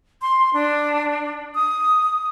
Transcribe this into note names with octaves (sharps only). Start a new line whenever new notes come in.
C6
D4
D#6